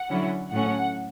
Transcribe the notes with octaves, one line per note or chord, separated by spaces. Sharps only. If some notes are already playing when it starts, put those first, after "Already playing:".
Already playing: F#5
D3 F#3 C#4 E4
A2 F#3 A3 C#4 F#5